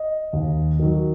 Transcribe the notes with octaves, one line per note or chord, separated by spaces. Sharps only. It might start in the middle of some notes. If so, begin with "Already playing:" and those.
Already playing: D#5
D#2
D#3 F#3